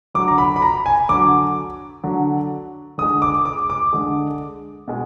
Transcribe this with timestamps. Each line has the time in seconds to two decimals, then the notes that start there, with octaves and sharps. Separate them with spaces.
0.14 D3 F#3 D6
0.28 A#5
0.38 B5
0.56 B5
0.62 A#5
0.86 G#5
1.09 D3 F#3 D6
2.03 D3 F#3
2.98 D3 D#6
3.02 G#3
3.22 D6
3.45 D6
3.70 D6
3.93 D3 G#3
4.88 B2 G#3